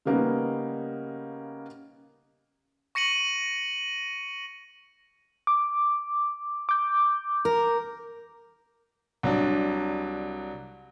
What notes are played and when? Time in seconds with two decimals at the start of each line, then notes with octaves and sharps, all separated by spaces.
0.05 C#3 G3 A#3 B3 C#4 D#4
2.95 C#6 A#6 C#7 D#7 F#7
5.47 D6
6.69 D6 G6
7.45 A#4
9.23 C2 F#3 D4